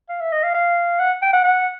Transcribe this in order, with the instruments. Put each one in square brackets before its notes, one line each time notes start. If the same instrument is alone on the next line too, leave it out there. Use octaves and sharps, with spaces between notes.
[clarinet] F5
E5
D#5
F5
F5
F#5
G5
F#5
F#5